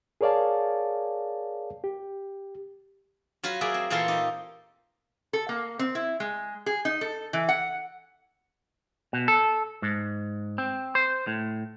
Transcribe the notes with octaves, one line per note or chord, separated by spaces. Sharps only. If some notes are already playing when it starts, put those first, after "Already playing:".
G#4 A#4 C#5 D5 F5 A5
G4
F#3 F4 F#4 B4
F#3 A#3 G#4 D5 E5
C4
A#2 E3 A#3 F4 A4 C6
D#4 G4
A4
A#3
C4
E4
G#3
G#4
D#4
A4
E3
F#5
B2
A4
G#2
C4
C5
A2